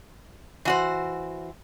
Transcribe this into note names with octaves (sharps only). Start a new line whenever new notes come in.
E3 F#4 C5